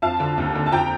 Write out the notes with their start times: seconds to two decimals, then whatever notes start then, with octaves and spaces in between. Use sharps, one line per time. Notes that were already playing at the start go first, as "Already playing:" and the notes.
0.02 F2 F5 A5
0.20 D3
0.38 D#2
0.55 D3
0.66 A5
0.72 F2 G5 A#5